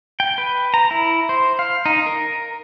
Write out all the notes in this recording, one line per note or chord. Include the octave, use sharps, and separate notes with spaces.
G5
B4
A#5
E4
C5
F5
D#4
A#4